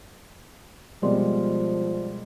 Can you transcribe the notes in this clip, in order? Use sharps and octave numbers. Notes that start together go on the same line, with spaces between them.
B2 F3 G3 G#3 A#4 D5 C6